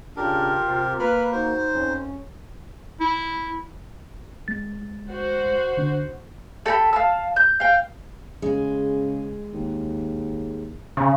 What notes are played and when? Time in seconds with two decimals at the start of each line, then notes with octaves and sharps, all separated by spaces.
0.17 C#3 D4 F4 G4 A#4
0.66 C3 C4
0.99 A#3 B4 B5 F6
1.32 D#4 F#4 C5
1.73 F2 C#4
3.00 E4
4.48 G#3 A6
5.11 F#4 C5
5.77 D3 D4
6.66 A4 G5 A#5 B5
6.93 F5 A5 E6
7.36 G6
7.60 F5 G5
8.42 C#3 G#3
9.54 D#2
10.97 C#3